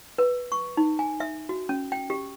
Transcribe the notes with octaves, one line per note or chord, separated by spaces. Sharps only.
B4
C#6
D#4
G#5
E5
F#4
C#4
G5
G4